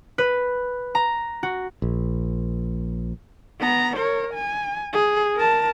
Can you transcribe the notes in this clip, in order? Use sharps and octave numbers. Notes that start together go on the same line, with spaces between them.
B4
A#5
F#4
A#1
B3 A#5
A#4 C#5
G#5
G#4
A#4 A5